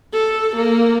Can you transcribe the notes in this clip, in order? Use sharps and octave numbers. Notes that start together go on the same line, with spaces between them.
A4
A#3